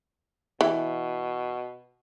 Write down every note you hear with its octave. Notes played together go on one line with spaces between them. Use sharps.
B2 E3